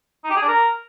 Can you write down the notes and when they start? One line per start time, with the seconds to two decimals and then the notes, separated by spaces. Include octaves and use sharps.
0.24 D#4
0.30 G4
0.36 G#4
0.42 D4
0.48 A#4